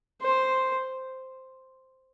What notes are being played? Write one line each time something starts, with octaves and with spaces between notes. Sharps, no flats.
C5